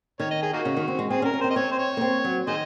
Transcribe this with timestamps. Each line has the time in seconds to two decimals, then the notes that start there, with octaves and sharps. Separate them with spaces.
0.20 D#3 C#5
0.31 D#5
0.43 G#4
0.53 A#3 D#4 F#4
0.65 C#3
0.77 D#3
0.88 C4
0.99 G#3
1.10 C4 G#4
1.22 C#4
1.25 A#4
1.34 C#4
1.41 C4 C5
1.50 D#5
1.56 C4 C#5
1.72 C5
1.78 C#5
1.97 A#3
2.01 C4
2.24 F#3
2.47 D#3 G#4 C5 D#5